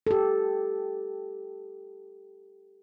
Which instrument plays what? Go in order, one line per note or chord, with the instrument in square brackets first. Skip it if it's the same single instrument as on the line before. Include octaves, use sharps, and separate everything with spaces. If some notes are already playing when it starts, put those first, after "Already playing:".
[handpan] G4 A4